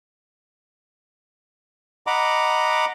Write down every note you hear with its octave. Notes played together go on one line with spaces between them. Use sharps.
D#5 F#5 A#5 B5 D6